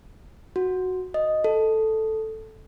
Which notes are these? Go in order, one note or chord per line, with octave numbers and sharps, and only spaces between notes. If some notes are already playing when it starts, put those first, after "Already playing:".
F#4
D#5
A4